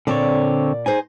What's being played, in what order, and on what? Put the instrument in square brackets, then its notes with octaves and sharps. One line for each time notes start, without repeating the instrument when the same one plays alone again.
[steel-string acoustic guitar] A#2 D5 [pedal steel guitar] D3 C4 C#5
[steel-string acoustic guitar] D#4 G#4 C5 [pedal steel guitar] G#5